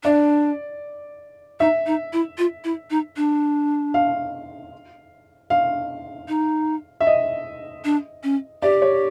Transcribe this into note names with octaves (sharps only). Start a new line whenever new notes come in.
D4 D5
D#4 E5
D#4
E4
F4
E4
D#4
D4
F5
F5
D#4
E5
D#5
D4
C#4
G4 D5
C#5